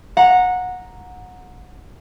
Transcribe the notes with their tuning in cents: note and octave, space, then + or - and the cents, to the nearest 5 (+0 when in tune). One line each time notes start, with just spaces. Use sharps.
F#5 -20 A#5 +0